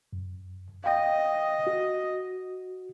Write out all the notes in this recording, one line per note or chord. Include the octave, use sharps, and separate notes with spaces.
F#2
D#5 F5 G5
F#4